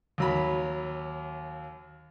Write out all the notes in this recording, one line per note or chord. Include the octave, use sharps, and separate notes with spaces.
D#2 F#3 B5